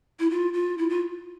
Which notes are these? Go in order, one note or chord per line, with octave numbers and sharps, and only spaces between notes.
E4
F4
F4
E4
F4